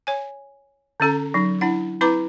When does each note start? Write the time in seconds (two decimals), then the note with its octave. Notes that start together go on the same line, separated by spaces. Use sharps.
0.07 C#5 G#5
1.00 D3 C#4 A4 A#5
1.34 F#3 D#4
1.61 D4 E4 F#5
2.01 C4 E4 B4 A#5 D6